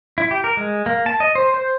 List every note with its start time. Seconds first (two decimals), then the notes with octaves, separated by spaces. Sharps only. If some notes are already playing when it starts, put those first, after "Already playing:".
0.18 E4
0.31 G4
0.44 A#4
0.57 G#3
0.86 A#3
1.06 A5
1.20 D#5
1.35 C5
1.54 C5